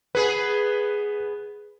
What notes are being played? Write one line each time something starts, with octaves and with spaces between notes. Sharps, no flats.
B3 G#4 B4